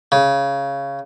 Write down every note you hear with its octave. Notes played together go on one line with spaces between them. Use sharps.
C#3